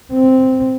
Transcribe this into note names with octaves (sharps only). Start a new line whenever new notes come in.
C4